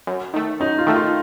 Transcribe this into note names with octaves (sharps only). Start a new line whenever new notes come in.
F#2
D#3 A3
F#2 D#4
F4
D#3 A3
F4